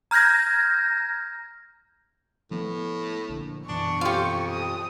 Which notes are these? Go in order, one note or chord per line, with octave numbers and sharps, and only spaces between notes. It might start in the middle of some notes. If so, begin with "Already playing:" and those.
A#5 F6 G6 G#6 A#6
A2 F3 A3 B3
A#1 A#2 D3
F#2 B2 E3 D4 C#6
F2 F4 G4
D#6